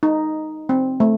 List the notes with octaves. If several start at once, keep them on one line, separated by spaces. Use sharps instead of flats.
D#4
C4
A3